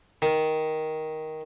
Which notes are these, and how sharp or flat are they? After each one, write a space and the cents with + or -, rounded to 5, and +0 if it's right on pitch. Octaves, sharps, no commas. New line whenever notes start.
D#3 +10